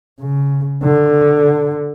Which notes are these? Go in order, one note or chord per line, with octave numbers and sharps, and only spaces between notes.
C#3
D3